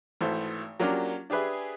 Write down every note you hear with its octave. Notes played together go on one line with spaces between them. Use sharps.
G#1 E3 A3 F#4 C5
F#3 A#3 C#4 D4 F4 G4
D4 G4 G#4 B4 E5